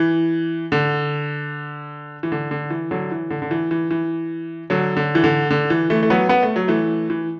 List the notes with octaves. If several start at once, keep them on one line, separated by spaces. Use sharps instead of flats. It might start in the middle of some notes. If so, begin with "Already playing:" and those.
Already playing: E3
D3
E3
D3
D3
E3
D3 F#3
E3
D3
D3
E3
E3
E3
D3 F#3
D3
E3
D3
D3
E3
E3 A3
A3
F#3 B3
B3
A3
F#3
E3 A3
E3